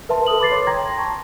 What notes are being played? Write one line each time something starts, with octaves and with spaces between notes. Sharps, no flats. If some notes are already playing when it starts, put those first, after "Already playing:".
A#4 B4 E5 A5 C6
A4 B4 A5 D#6 F#7
B5 D6 A6 C7
C#5 C6 D6
G5 A#5 C6 G#6 A#6
A5 A#5 C#6